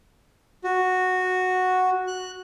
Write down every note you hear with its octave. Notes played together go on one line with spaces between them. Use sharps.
F#4
F#6